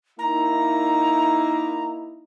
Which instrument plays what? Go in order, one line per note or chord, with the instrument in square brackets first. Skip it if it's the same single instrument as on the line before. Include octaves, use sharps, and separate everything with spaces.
[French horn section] A#3 D#4 E4 [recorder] A#5